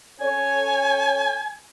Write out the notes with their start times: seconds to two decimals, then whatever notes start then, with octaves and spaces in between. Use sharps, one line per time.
0.21 C#4 A4 C#5 G#5